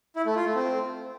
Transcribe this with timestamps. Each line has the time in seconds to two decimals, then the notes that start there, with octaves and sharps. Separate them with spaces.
0.16 E4
0.26 A3
0.35 F4
0.45 A3
0.55 C4